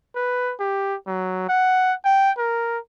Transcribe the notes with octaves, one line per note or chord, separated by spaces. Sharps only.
B4
G4
F#3
F#5
G5
A#4